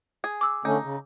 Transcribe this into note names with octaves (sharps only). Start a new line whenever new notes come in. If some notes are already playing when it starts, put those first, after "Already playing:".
G#4
D6 E6
D3 A3 C#4 D#4
C#3